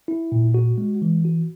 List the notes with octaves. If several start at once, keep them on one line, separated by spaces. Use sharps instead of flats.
E4
A#2
F#4
G#3
E3
F#4